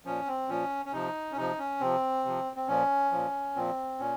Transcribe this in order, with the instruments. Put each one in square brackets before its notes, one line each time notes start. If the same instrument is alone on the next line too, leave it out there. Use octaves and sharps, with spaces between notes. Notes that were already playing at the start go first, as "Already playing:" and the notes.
[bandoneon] A#2 F3 C#4
C4
A#2 F3 C#4
C#4
C3 F3 D#4
C#4
C3 F3 D#4
C#4
C3 F3 C4
C3 F3
C4
A#2 F3 C#4
A#2 F3
A#2 F3 C4
A#2 C#4